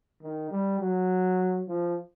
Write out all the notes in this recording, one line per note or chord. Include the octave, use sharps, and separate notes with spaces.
D#3
G3
F#3
F3